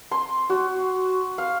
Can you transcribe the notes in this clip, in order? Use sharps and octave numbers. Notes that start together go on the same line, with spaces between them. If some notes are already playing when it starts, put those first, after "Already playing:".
C6
F#4
F5